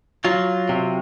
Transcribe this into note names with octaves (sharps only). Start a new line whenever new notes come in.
F#3 F4
C3